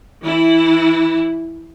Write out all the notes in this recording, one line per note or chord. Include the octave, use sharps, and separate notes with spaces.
E3 E4